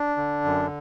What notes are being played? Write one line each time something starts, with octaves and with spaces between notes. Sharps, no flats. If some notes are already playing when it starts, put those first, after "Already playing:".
Already playing: D4
D3
F#2